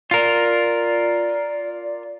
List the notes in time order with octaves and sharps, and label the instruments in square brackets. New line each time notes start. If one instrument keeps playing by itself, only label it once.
[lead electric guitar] F4 A#4 [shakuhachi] D5